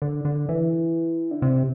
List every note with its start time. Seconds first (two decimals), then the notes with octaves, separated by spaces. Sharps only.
0.02 D3
0.25 D3
0.49 E3
1.31 D3
1.42 C3